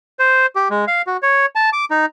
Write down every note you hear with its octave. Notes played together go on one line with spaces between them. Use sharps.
C5
G4
G#3
F5
F#4
C#5
A5
D6
D#4